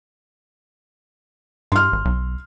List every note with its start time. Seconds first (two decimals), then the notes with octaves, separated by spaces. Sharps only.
1.72 G2 C6 F6
1.93 G#1
2.05 B1